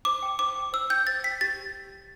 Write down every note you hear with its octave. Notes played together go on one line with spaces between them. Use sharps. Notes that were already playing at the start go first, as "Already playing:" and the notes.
C5 D6
G5
C5 D6
G5
C5 E6
G5 G6
C5 A6
G5 B6
G4 A6